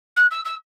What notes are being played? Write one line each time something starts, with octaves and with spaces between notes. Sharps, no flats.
F#6
E6
E6